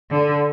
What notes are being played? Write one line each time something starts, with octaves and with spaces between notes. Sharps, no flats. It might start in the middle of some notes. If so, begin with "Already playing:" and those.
D3